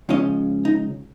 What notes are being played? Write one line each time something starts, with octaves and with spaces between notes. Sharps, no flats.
C#2 C#3 F3 C#4 D#5
D#4